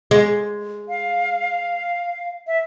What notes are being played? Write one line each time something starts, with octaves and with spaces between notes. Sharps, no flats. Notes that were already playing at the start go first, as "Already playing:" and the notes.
G#3
F5
E5